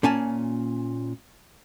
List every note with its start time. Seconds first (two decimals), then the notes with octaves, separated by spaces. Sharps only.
0.03 A#2 C#4 G#5 A5